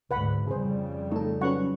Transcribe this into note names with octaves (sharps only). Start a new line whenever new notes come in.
D2 G#2 B4 F#5 B5
F2 C#3 G3 G#4 C5
A3 D#4 A4
F#3 C#4 B4 F#5 C#6